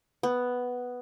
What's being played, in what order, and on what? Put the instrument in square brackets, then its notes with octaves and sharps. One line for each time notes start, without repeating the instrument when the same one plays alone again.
[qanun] B3